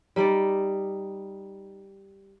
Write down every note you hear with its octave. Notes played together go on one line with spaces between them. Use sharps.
G3 D#4 D5